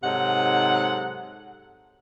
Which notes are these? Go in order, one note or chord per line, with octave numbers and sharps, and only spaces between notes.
G#2 C3 F#3 D#4 A4 F#5